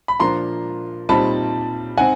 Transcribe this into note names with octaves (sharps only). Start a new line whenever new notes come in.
B5
A#2 F3 A#3 D4 A#5 C6
A#2 G3 C4 D#4 A5 B5
C4 D#4 F#5 G#5